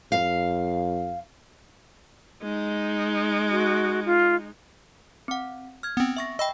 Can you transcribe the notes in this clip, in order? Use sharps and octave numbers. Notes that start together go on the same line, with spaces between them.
F2 F5
G#3 D#4
F#4
F4
C4 F#5
F6 G#6
B3 C4
E5 C#6 A#6
D#5 G5 B5 E6